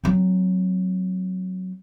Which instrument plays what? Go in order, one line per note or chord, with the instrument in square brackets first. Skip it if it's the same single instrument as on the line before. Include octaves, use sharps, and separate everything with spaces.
[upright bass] F#3 C4